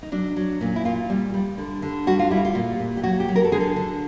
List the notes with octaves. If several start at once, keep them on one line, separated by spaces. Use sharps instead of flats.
D#4
F#3 D4
F#3
A#2 C#4
E4
A#2 F4
G3
G3
D3
D3
G3 F#4
F4
G3 E4
F4
A#2
A#2
G4
F#3 F#4
G4
F#3
A#4
A4
D3 G#4
A4
D3